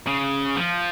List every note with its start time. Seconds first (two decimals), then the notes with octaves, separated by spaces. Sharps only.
0.08 C#3
0.56 F3